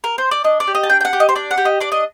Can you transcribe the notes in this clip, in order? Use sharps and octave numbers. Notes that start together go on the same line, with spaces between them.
A#4
C5
D5
D4 D#5
D5
G4
D#5
A5
D4 G5
G5
F#5
G4
D#5
C5
D4 D5
F#5
G4
D#5
D4 D5
D#5